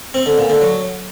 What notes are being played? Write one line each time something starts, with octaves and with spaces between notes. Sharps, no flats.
C4
D3
A#2
D3
F#3